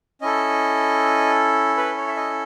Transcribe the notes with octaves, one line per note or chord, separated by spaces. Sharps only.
C#4 E4 A4 D#5
B4
C#5
E5
D#5